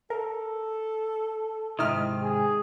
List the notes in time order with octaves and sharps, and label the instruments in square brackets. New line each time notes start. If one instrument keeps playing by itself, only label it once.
[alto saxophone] A4 [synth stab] A#4
[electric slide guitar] G#2 C3 D#3 [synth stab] E4 D#5 F6
[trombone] G#4